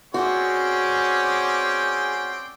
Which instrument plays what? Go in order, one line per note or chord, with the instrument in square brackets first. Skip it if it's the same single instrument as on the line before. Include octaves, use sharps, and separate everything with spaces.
[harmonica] C4 D5 G5 [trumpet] C#4 [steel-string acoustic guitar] F#4 [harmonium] G#4